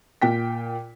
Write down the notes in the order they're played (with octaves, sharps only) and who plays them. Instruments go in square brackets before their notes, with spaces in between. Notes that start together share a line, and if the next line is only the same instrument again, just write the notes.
[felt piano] A#2 G5 B6